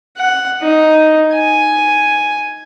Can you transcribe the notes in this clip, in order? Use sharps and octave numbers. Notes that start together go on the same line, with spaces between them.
F#5
D#4
G#5